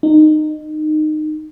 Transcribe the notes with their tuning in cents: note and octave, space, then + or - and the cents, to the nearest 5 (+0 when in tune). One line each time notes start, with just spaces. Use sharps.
D#4 -20